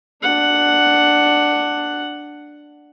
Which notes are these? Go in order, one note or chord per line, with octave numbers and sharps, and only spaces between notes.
D4 F#5